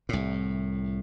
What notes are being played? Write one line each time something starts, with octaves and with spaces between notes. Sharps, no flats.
C2 A2